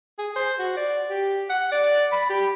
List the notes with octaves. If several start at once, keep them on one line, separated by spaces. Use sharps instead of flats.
G#4
C5
F#4
D5
G4
F#5
D5
B5
G4